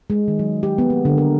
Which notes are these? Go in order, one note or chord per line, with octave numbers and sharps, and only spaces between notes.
G#3
D#3
F#3
G4
B3
A#3
D3
A#4